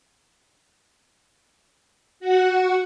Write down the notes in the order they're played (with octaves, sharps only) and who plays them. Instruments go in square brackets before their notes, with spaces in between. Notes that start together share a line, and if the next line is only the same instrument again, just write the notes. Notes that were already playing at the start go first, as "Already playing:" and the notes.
[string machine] F#4 F#5